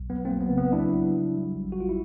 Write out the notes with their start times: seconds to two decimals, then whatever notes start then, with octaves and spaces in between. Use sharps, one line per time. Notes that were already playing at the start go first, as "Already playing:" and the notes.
Already playing: B1
0.10 F#3 B3
0.25 A#3 C4
0.31 F#3
0.41 B3
0.51 C#3
0.58 B3
0.72 F#3 D4 E4
0.94 F#3
1.14 F#3
1.35 G3
1.56 A1
1.72 F#4
1.78 A1 F4
1.89 E4